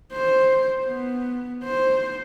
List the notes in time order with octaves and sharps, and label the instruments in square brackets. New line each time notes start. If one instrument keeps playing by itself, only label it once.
[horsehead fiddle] C5
B3
C5